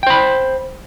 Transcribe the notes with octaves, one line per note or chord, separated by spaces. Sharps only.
C5 G5 B5